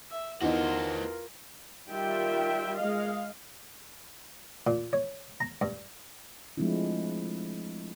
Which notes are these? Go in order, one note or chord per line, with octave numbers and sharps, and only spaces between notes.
E5
E2 D#4 F4 F#4 A#4 C5
D#3 G3 F4 E5 G5
G#3 D#5 F5
A#2
C#5
A#5
G2
F3 G#3 A3 C4 D4 E4